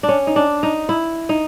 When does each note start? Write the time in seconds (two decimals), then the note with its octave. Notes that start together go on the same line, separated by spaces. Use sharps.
0.03 D4
0.09 C#4
0.27 D#4
0.36 D4
0.63 D#4
0.89 E4
1.29 D#4